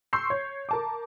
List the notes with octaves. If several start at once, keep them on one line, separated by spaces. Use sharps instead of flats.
C6 C#6 E6 G6 C7
C#5
A#4 A5 D6